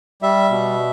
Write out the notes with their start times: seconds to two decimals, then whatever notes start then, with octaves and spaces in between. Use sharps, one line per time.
0.22 G3 E5
0.50 B2